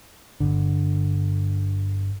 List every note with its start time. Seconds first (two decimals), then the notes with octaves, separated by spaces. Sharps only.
0.40 G1 D3